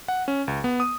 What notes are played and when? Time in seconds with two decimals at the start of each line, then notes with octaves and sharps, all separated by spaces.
0.08 F#5
0.28 C#4
0.48 C#2
0.64 B3
0.80 D#6